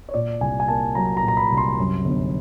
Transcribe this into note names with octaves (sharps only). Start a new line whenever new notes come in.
C#5
A#2 D5
C2 G#5
G#5
A#3 A5
F#3 A#5
A#5
A#2
A#5
B5
C2
C6
F#2
G1